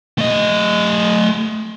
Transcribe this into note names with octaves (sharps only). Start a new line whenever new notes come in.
A3 D#5